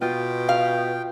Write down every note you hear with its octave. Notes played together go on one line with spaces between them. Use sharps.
B2 F4 G5
F5